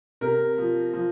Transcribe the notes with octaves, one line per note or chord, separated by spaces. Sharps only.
C3 A#4
F3
F3